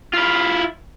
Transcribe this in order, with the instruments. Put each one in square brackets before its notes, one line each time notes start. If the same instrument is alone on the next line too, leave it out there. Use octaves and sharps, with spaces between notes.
[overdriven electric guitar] E4 F4